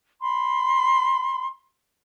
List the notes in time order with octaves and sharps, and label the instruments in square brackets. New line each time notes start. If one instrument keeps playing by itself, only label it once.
[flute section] B5 C6